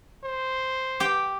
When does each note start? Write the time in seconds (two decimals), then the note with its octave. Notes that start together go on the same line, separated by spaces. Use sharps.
0.24 C5
1.00 G4 G5